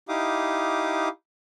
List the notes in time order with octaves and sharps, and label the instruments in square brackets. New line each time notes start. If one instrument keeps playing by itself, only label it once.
[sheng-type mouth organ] D#4 E4 G4 F5 D6 D#6